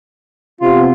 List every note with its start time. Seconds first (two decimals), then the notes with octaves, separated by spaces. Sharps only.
0.61 C3 B3 F4